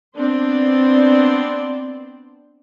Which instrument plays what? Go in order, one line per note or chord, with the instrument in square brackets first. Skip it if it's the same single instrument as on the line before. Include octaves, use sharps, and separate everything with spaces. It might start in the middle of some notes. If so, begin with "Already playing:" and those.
[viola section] B3 C4 D4 C5 D5